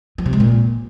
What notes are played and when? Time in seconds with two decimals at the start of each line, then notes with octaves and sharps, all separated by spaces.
0.18 F3
0.26 C3
0.33 G#3
0.40 A#2